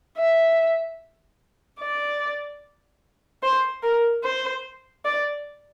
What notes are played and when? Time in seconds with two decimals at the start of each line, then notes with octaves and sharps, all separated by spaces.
0.17 E5
1.80 D5
3.43 C5
3.83 A#4
4.24 C5
5.05 D5